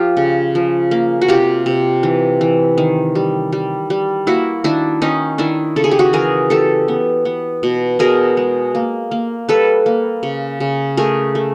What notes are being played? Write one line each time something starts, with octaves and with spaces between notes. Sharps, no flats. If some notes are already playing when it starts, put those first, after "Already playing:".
Already playing: F3 F4 G4
C#3
F3
A#3
F#4
C3 F4 G4
C3
E3
E3
D#3
G3
G3
G3
A#3 E4 F#4
D#3 D4 E4
D#3 C#4 D#4
D#3 D4 E4
C#3 A4
G#4
G4
F#4 G#4
E3 G#4 A#4
E3 G4 A4
B3
B3
B2
B2 G#4 A#4
G#3
A#3
A#3
G3 A4 B4
A#3
C#3
C#3
A3 G#4 A#4
A3